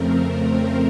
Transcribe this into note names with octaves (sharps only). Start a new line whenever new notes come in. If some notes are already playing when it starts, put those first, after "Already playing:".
Already playing: F2 C#3 F3 A3 C4 A#4
A#4
A#4